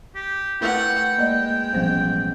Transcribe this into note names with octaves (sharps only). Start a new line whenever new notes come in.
G4
A3 E4 A#4 B4 F#5 G5
G#3 A#3 D5 D#5
A1 B2 F3 G3 C5